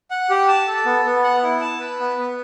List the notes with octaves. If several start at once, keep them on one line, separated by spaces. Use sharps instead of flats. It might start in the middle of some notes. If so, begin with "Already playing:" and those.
F#5
G4
A5
A4
B3
B3
F#5
E4
A5
B4
B3
B3